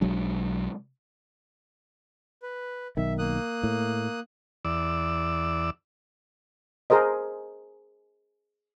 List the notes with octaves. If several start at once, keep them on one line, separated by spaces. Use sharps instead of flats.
B1 F#3 G#3 D4
B4
B1 D#3 E5
A#3 D#6 F#6
A2
E2 D5 E6
G#4 A#4 C5 D#5